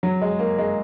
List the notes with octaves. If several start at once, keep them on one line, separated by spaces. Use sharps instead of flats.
F#3
G#3
A#3
G#3